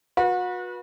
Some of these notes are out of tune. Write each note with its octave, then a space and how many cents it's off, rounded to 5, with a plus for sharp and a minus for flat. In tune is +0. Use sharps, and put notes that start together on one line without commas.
F#4 -35 B4 -25